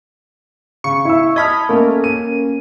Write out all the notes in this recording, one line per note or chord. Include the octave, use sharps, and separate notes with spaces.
C#3 C#6
E4 E6
D#5 A5 B5 F6 G#6
A3 A#3 C#4
D#7